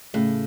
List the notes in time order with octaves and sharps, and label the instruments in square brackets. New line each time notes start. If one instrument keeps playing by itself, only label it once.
[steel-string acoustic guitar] A2 [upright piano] C#3